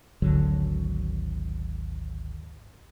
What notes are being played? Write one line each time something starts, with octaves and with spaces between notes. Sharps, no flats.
G#1 D2 D3 F#3